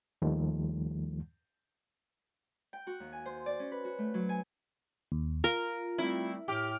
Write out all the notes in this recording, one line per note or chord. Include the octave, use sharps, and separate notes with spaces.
D#2 D#3 F3 G3 A3
G5
F#4
D#2
G#5
C5
D5
C#4
B4
F#4
A3
F#3
G#5
D#2
F4 A#4
G3 A3 C4 E4
A2 G4 D6 F6